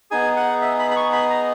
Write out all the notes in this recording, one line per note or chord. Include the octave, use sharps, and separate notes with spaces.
B3 D#4 G#4 G#5
F#5
E5
B5
B5
C#6
B5
A#5